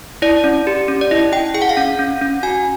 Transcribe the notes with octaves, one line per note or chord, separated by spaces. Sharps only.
E4 D5
C#4
G4
C#4
D5
E4 D#5
E4 G5
G#4 G5
F#5
F5
C#4 F#5
C#4
C#4
F#4 G#5